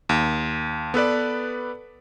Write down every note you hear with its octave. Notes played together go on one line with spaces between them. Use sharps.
D#2
B3 A4 B4 D5